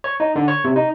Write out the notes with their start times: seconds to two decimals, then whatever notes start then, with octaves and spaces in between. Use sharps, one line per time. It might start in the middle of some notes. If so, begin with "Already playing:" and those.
0.04 C#5
0.20 D#4
0.36 D3
0.48 C#5
0.64 C3
0.76 D#4